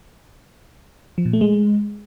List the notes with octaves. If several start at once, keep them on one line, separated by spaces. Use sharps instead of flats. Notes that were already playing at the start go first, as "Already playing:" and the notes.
F3
A#2
A3
G#3